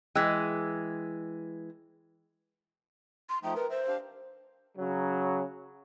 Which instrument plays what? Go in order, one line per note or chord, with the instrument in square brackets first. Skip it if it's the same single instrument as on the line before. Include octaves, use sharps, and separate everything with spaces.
[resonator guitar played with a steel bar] E3 G#3 [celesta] G5 E6 F#6
[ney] C6
[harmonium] F3 A3 D#4 [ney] G5
[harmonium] A#4 [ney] B4
[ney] C5 [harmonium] E5
[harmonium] D4 G4 F5
[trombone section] C#3 F#3